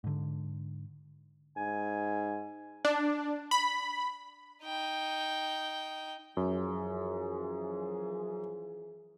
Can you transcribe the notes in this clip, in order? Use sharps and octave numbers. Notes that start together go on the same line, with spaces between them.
G#2 D3
G#2 G#5
D4
B5
D#4 G5
F#2 E3 F3 G#4